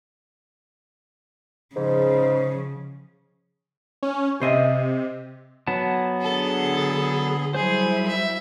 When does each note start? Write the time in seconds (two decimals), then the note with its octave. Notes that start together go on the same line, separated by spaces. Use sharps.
1.76 G#2 C#3 F3
4.03 C#4
4.42 C3 C5 D#5 E5
5.67 F#3 B3 A5
6.21 D3 G#4 A4
7.55 F#3 G3 E4 G#4 C5
8.07 E5